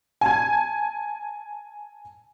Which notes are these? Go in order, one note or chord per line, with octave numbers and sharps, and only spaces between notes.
G#5 A5 G#6